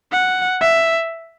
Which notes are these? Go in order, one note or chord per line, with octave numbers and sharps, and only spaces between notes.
F#5
E5